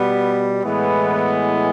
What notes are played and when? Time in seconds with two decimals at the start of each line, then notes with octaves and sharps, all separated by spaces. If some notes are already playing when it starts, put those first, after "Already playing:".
Already playing: B2 G3 B3
0.63 A2 E3 G#3 B3